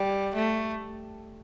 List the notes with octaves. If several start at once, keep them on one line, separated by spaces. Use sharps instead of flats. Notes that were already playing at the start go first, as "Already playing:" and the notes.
Already playing: G3
A3